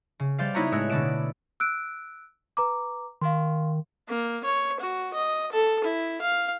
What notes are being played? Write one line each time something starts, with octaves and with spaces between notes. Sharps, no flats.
C#3
G3 C5 D5 F5
B3 D#4 E4 F#4 C#5 A#5
A2 G#3 A3 C#5 E6 F#6
B2 D3 F#4 D5 D7 E7
E6 F#6 D7
B4 A#5 D6
D#3 F5 C6
A#3
C#5
F#4
D#5
A4
E4
F5